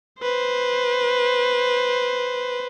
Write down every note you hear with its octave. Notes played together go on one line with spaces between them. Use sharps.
B4 C5